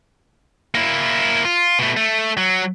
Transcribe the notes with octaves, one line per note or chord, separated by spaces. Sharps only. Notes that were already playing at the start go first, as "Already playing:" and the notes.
A#3 E4
F4
B2 A3
A3
F#3